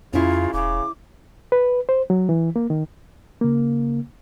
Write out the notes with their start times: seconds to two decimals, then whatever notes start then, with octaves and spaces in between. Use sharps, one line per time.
0.13 F2 C#3 C#4 E4 F4
0.54 E1 C#3 D6
1.52 B4
1.89 C5
2.10 F#3
2.29 E3
2.56 A#3
2.70 D#3
3.41 C#3 A#3